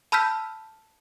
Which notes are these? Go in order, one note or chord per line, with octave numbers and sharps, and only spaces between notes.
A5 B5 E6 F6 G6 B6